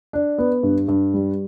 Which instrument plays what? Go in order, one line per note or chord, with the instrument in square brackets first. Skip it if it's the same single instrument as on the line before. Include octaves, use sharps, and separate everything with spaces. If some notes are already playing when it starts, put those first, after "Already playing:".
[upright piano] D4
B3
G2
G2
G3